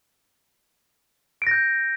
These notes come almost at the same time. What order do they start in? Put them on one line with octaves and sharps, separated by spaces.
D7 A#6 G6